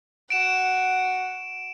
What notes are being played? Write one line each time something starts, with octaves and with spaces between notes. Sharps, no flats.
F#4 F#5 D7 E7